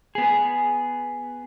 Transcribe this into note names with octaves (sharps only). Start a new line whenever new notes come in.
B3 G#4